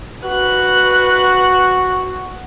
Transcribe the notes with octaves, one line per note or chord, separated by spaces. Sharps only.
F#4 B4 F#6